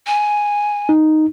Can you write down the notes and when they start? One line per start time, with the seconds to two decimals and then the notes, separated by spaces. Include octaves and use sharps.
0.07 G#5
0.89 D#4